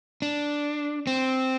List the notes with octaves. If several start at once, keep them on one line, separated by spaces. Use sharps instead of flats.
D4
C4